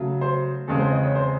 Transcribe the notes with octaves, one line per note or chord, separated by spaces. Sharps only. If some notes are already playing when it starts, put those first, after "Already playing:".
Already playing: C#3 F#3 A3
C5
E2 C#3 G#3 C4 A4
C5
D#5
C#5
C5